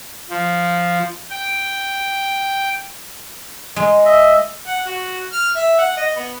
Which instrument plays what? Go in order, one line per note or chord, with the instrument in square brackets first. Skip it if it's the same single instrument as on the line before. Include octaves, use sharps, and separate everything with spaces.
[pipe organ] F3
G5
[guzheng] G#3
[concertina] D#5 E5
[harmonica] F#5
F#4
F6
E5
F#5
D#5
B3